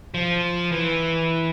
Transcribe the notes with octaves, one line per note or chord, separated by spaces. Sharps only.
F3
E3